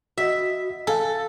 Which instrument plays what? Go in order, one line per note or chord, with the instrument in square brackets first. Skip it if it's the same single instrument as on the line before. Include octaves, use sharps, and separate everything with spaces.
[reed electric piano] F#4 D#5 [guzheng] E5
[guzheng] A4 [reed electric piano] F5 G#5